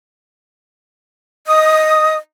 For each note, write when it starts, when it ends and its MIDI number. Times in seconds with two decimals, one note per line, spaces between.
1.47 2.16 75
1.47 2.16 87